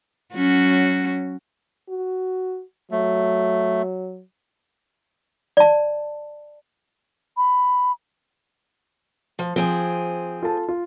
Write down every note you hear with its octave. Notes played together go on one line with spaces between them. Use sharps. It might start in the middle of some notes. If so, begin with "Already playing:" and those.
F#3 C#4 F#4
F#4
F#3 A3
D5 A5
B5
F3
F3 C4 G#4 G#5
F4 A4 A5
F4